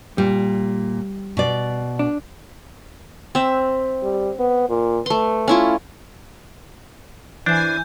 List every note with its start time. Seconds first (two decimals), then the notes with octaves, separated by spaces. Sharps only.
0.18 A#2 G3
1.37 B2 D5
1.99 D4
3.35 C4 E5
4.03 G3
4.39 B3
4.70 A#2
5.06 A3 B4 C6
5.48 C#4 E4 F4
7.46 E3 D4 C5 G#5 G6